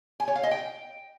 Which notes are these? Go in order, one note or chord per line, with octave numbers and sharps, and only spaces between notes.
G#5
C#5
F5
D#5
G5